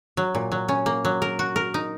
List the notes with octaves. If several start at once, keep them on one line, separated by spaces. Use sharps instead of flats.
F#3
A#2
F#3
C#4
A#3
F#3
A#4
F#4
A#4
D#4